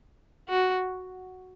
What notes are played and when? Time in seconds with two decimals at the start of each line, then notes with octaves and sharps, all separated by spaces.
0.49 F#4